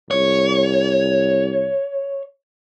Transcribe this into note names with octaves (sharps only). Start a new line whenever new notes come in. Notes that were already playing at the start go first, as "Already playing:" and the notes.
C2 C#5